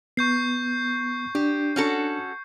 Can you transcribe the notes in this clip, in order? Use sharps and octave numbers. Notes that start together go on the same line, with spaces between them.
B3 C#6 G6 C7
D4 G4
C#4 F#4 A4